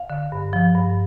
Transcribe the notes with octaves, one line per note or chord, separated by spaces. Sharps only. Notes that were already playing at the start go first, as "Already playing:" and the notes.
Already playing: F5
D3
G2
F3
G2